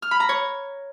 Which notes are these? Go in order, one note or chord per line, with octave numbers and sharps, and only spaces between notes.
F6
B5
A#5
C#5